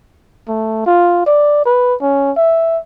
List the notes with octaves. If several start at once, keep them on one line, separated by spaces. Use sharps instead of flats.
A3
F4
D5
B4
C#4
E5